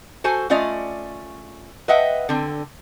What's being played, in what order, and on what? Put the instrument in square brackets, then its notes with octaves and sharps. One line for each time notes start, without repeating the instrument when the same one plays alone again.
[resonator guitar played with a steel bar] F#4 A4 C5 G#5
A3 C#4 F4 D5 D#5
B4 D#5 E5 F#5 G5
D3 C4